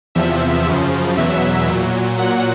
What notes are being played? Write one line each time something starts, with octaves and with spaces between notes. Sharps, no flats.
E2 C3 F3 E5
F#2 C#3 F3
E2 B2 F#3 E5
A#2 F#3
A#2 F#3 F#5